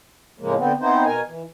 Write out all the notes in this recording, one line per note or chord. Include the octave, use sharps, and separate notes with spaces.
A2 C#3 F3 G#3 A#3
D3 B3 C4
B3 C4 D#4 E4 C5
B2 A#4 G#5
E3